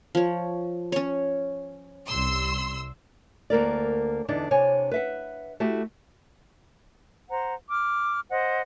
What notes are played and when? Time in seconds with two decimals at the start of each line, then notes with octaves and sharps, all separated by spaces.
0.15 F3 C#5
0.92 C#4 C#5
2.06 C2 C6 E6
3.50 D2 A#3 A#4 D5
4.28 E2 D3 D4 D#4 D5
4.51 C3 D4 C#5 G#5
4.91 B4 E5 F#5
5.60 A3 E4 F#4 G4
7.29 C5 F#5 A#5
7.69 D6 F6
8.30 C5 D#5 F#5